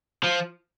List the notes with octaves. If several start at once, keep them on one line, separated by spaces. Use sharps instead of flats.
F3